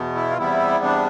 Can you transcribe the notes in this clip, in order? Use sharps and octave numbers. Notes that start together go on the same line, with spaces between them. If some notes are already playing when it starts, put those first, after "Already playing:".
Already playing: E2 B2 B3
E4
F4
E2 C3 G3 B3 E4
D4